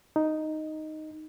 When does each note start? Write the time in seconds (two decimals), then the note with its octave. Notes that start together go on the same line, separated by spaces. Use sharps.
0.16 D#4